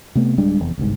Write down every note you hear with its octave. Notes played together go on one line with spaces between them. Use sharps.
C3 A3 B3
D1 G3 G#3 D4
F1 E2
G1 C2 G#2